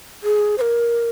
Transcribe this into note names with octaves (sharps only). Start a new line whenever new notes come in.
G#4
C5
A#4